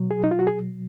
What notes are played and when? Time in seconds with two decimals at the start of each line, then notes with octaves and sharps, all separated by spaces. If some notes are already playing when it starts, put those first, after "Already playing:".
Already playing: B2 F#3
0.11 G#4
0.24 D#4
0.31 F4
0.39 F#4
0.47 G#4